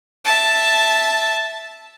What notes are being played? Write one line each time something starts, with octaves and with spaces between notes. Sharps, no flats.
E5 A5